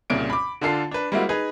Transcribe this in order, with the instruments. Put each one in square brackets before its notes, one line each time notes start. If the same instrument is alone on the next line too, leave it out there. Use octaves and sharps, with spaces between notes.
[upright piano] C2 A#2 C#3 D7
B5 D6
D3 D4 F4 A4 C7
D4 B4
G3 G#3 A#3 C4 E4 F#4
D#4 G#4 B4